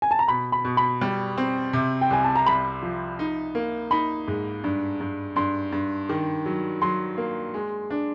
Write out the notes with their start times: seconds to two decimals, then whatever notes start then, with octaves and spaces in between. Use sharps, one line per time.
0.02 G#5
0.11 A5
0.19 A#5
0.28 B2 B5
0.52 B5
0.65 B2
0.77 B5
1.01 G3
1.37 C4
1.73 C3
2.01 G5
2.10 C2 G#5
2.24 A5
2.36 A#5
2.46 C2 B5
2.82 F3
3.19 D#4
3.55 A#3
3.91 D#4 B5
4.28 G#2
4.64 G2
5.00 G2
5.36 G2 C6
5.72 G2
6.09 D#3
6.46 F#3
6.81 F#3 C6
7.17 A#3
7.54 G#3
7.90 D4